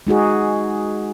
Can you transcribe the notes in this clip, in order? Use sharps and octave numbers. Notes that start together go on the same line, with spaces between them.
G#3 D#4 F#4 G#4